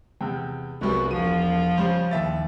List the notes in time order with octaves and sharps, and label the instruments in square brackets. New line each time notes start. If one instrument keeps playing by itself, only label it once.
[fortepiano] E2 C3 [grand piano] G5
[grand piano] C2 G#4 [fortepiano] F#3 G3 B3 [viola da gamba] F#4
[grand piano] E1 D#7 [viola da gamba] F3
[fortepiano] C#3 G3 [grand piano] C5
[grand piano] D#2 E5 A6